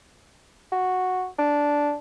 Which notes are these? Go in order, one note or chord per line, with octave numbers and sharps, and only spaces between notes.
F#4
D4